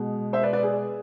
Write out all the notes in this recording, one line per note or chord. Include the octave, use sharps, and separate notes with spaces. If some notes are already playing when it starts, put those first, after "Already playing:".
Already playing: B2 G#3
C5 E5
B4 D5
B4 D5
G#4